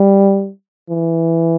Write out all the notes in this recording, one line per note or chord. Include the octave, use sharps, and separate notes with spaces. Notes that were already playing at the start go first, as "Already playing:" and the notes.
Already playing: G3
E3